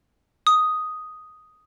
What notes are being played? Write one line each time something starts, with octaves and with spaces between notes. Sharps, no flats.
D#6